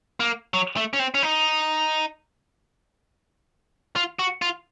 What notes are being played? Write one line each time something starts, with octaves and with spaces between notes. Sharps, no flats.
A#3
F#3
A3
C#4
C4
C#4
D#4
F4
F#4
F4